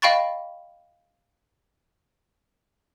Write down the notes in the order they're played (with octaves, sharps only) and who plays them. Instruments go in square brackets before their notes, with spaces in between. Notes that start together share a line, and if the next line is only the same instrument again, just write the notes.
[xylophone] D#5 F5 G5 B5 C#6 A6